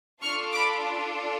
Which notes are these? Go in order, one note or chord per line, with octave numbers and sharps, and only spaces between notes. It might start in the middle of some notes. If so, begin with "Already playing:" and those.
D4 F4 A4 C#6 F6
B5 D6